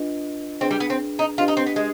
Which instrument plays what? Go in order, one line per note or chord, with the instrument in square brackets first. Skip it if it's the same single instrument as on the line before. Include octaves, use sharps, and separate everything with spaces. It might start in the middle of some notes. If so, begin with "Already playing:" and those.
Already playing: [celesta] D4 F4 B4 D#5
[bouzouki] C4 [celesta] D4 G#4 B4
[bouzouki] G3
B3
C4
D#4
[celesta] D4 G4 B4 D#5 [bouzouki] F4
[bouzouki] D#4
C4
B3
G#3